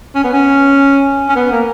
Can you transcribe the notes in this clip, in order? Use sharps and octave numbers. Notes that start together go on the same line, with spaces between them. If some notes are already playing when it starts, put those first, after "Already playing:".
C#4
B3
C#4
C#4
B3
A#3